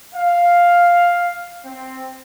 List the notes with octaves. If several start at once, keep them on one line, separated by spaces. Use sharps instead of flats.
F5
C4